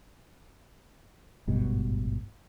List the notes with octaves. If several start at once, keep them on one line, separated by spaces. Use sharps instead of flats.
D1 G#1 G2 B2